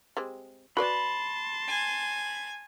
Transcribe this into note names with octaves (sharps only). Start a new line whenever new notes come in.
G3 G#3 C4
F#4 B4 D5 A5 B5 C6
G#5